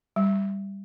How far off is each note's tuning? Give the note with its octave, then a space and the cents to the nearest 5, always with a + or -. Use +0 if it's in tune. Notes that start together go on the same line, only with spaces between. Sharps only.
G3 +10